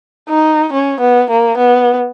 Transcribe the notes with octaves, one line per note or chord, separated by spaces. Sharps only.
D#4
C#4
B3
A#3
B3